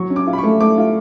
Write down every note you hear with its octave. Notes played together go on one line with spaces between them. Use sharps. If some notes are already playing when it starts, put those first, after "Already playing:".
Already playing: F#3 C#6
C#4
D6
F4
B5
C#6
A3
A3 D6
F4